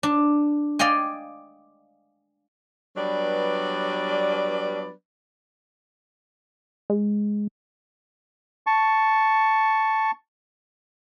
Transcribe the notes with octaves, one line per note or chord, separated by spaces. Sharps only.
D4
D5 D#5 F5 G5 G#5
F#3 G3 B3 D4 B4 D5
G#3
A5 C#6